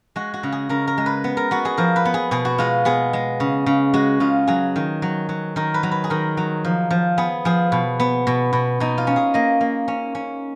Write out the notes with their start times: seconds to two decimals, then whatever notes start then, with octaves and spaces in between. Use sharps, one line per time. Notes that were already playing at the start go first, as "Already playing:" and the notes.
0.16 G#3 F#4
0.34 F#4
0.43 C#3
0.52 G#4
0.69 C#3 A#4
0.87 A#4
0.98 G#3
1.06 B4
1.24 B3
1.37 A#4
1.51 B3 F#4
1.65 G#4
1.77 F3 A#4
1.96 B4
2.05 B3
2.14 G#4
2.31 B2 G#4
2.45 F#4
2.58 G#3 F4
2.85 B3 G#4
3.13 G#3
3.40 C#3
3.66 C#3
3.94 G#3 F#4
4.20 C#3 F4
4.47 F#3 G#4
4.76 D#3
5.02 F#3
5.29 F#3
5.56 D#3 A#4
5.74 B4
5.83 F#3
5.91 B4
6.04 G#4
6.10 D#3 A#4
6.37 F#3
6.65 F3
6.91 F3
7.18 B3 G#4
7.45 F3 G#4
7.72 B2
8.00 B3
8.27 B2
8.53 B2
8.80 B2 D#4
8.98 F4
9.07 C#4
9.16 G#4
9.34 A#3 D#5
9.61 A#3
9.88 C#4
10.15 C#4